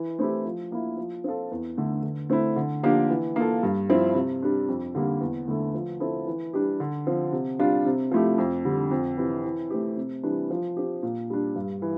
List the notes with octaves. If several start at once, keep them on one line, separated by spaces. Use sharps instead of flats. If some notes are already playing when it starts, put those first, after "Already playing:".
Already playing: E3
A3 C4 E4 G4
F3
A#3 E4
F3
C4 F4 A4
E2
D3 A3
D3
A3 C4 E4
D3
F3 A#3 D4 G4
E3
A#3 F4 A4
G2
F3 C4 E4
C3
G3 D4
F2
D3 G3 A#3
E2
D3 A3 E4 A4
F3
C4 E4 A4
E3
G3 D4 G4
D3
F3 C4
C3
G3 D4 F4
C3
F3 A3 E4 G4
F2
D3 G3
F2
C3 E3
E3
A3 C4 G4
C3
E3 G3 D4
F3
C4 G4
A#2
G3 D4
G2
E3